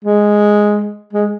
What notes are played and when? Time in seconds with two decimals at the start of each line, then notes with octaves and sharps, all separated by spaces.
0.04 G#3
1.13 G#3